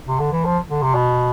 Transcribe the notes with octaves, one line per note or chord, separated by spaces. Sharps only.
C3
D3
E3
F3
D3
C3
B2